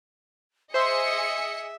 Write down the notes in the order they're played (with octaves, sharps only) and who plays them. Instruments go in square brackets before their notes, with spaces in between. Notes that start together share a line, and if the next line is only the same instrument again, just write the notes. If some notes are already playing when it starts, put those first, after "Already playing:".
[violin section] G#4 D#5 C#7 [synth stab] C5 C6 [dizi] E5